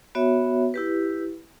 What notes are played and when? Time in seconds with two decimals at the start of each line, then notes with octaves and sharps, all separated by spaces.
0.15 B3 F#4 C#5 E5
0.74 E4 G4 B4